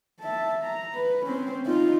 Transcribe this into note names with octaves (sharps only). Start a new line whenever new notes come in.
E5 A5
A#5
B4
C4 C#4
D#4 F4